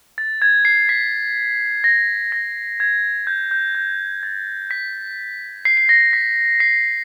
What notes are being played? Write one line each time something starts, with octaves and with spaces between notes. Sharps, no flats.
A6
G#6
C7
B6
A#6
A#6
G#6
G6
G6
G6
A6
B6
C7
C7
A#6
B6
C7